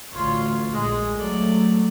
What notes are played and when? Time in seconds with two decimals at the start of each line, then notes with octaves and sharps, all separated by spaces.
0.11 A1 D2 F4 C#5
0.72 A#1 G#3
1.16 F#3 A3 A4 D5